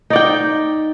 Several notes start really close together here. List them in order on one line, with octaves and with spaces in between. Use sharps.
D#4 D5 G5